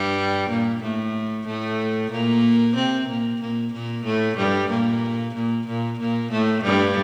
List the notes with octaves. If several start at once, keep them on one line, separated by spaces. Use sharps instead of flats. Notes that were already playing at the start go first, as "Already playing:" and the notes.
Already playing: G2 G3
A#2 A#3
A2 A3
A2 A3
A#2 A#3
C3 C4
A#2 A#3
A#2 A#3
A#2 A#3
A2 A3
G2 G3
A#2 A#3
A#2 A#3
A#2 A#3
A#2 A#3
A2 A3
G2 G3